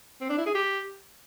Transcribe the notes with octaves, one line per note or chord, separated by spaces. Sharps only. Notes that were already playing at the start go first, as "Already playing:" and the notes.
C4
D4
E4
G#4
G4